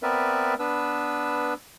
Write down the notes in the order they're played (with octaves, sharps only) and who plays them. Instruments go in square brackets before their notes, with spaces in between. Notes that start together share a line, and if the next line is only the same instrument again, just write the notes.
[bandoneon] B3 C4 A#4 B4 D5 E5
B3 D4 B4 E6